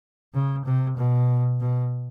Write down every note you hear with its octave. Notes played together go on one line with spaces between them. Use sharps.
C#3
C3
B2
B2